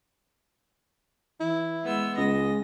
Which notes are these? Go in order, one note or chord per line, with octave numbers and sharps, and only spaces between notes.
E3 E4
G#3 B3 E6
C#2 G#3 D#5 A#6